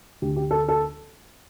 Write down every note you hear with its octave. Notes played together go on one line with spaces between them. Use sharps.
D2 D3 G4
G4
A4
A4